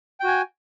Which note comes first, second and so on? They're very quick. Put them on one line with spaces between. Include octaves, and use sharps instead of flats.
G5 F#4 G#5